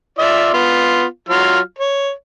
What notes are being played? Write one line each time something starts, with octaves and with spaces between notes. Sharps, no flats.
F4 D5 E5
B3 F4
F#3 F4 F6
C#5